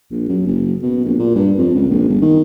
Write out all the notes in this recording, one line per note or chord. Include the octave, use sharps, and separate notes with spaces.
A#1
F#2
F#1
B2
A#1
A#2
G2
F2
C#2
A#1
G1
D#3